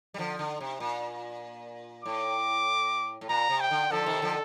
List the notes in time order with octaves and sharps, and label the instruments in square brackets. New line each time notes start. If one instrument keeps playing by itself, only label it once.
[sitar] G3
D3 F3
D3
C3
A#2
[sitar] A2 [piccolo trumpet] D6
[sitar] A2
[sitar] A#2 [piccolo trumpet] A#5
[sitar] C3
[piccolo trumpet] G5
[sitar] D3
[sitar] D3 F3 [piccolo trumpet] A4
[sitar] C3 D#3
D3 F3